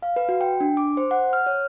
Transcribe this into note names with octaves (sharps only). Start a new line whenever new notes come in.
F5
B4
F#4
G5
D4
D6
C5
F#5
F6
C#5